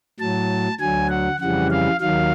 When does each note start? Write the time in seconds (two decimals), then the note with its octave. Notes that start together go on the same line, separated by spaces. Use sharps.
0.20 A2 F#3 A5
0.79 D2 D3 F#3 G#5
1.09 F#5
1.40 F2 C#3 E3 G3 F#5
1.70 F5
2.00 D#2 D#3 F#3 F5